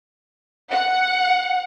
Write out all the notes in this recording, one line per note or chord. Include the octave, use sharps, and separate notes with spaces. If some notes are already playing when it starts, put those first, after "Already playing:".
F#5